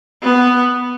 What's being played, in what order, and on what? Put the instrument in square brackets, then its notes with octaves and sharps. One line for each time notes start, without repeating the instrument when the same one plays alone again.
[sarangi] B3